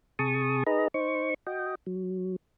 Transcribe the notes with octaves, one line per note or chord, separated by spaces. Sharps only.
C3 G#4 A5 C#6 D#6
D#4 G#4 B4 D#5 A#5
D#4 C5 C#6
F#4 D#5 G5
F#3